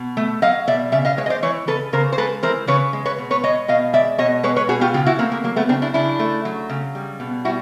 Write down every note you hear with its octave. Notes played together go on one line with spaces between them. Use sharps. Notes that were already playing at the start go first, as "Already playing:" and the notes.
Already playing: B2
A3
F#3 D#5 F5
B2 D5 E5
C#3 D5 E5
D#5 F5
G#3 B4 C#5
D#5
C5 D5
E3 B4 C#5
C#3 A4 B4
C#3 A#4 C5
C5
G#3 A4 B4
E3 A#4 C5
C#3 B4 C#5
G#3
B4 C#5
B2
B4 C#5
G#3 C#5 D#5
B2 D#5 F5
G#3 D5 E5
B2 C#5 D#5
G#3 B4 C#5
B4 C#5
B2 F#4 G#4
F4 G4
C#3 F4 G4
E4 F#4
A3 A#3 C4
A#3
F#3 A#3
A3 B3
C#3 C4 D4
D4 E4
C#3 D4 E4
A3
F#3
C#3
G3
B2
G3 E4 F#4